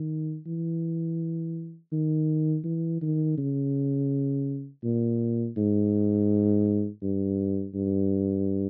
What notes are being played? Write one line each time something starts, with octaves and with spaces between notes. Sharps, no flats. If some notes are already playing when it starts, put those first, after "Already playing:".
Already playing: D#3
E3
D#3
E3
D#3
C#3
A#2
G#2
G2
G2